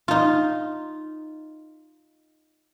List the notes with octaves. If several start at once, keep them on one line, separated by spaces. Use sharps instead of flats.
D#4 F4